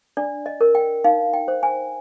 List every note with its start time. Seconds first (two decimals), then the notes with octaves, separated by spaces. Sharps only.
0.17 D4 D5
0.46 D#5
0.61 A#4
0.75 G5
1.04 D#4 F5
1.33 G5
1.48 C5
1.63 G#5